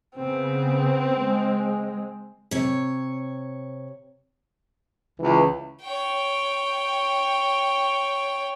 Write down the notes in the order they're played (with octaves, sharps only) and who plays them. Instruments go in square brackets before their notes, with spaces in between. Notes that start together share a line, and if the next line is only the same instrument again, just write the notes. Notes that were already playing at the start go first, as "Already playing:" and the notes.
[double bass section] C#3 B3 [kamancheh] C4
[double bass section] G#3
[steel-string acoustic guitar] C3 C#5
[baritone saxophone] C#2 [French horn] E3
[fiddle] C#5 G5